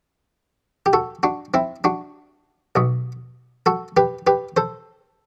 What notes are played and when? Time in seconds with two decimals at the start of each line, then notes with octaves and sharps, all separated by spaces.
0.86 G4
0.93 F#4 A4
1.23 D4 F#4
1.54 C4 E4
1.84 D4 F#4
2.76 B1 B2
3.66 F#4 A4
3.97 G4 B4
4.27 G4 B4
4.57 A4 C5